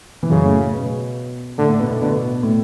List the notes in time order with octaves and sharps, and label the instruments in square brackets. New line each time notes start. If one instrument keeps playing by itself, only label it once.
[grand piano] E3
[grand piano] F#2 F#3 [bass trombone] C#3
[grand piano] A2 A3
B2 B3
[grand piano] A2 A3 [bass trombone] D3
[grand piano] A2 A3
B2 B3
A2 A3
[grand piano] B2 B3 [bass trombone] D3
[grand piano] A2 A3